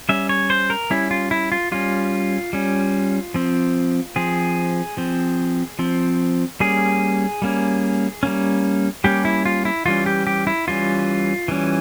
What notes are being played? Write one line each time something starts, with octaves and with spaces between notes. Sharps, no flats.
G3 C#4 E5
C#5
C5
A#4
G3 C#4 E4
F4
E4
F4
G3 C#4 F4
G3 C#4
F3 C4
F3 C4 G#4
F3 C4
F3 C4
G3 A#3 C#4 G#4
G3 A#3 C#4
G3 A#3 C#4
G3 A#3 C#4 G4
E4
F4
E4
E3 G3 C#4 F4
G4
G4
E4
E3 G3 C#4 F4
E3 G3 C#4